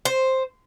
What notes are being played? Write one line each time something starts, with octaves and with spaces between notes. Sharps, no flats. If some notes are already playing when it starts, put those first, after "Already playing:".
C5